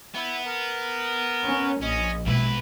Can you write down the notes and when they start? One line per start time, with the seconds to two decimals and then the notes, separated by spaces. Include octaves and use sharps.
0.15 B3 E4
0.45 A#4
1.43 C#4
1.82 A#1 C#4 D#5
2.26 B1 B2 G#3 E4 B4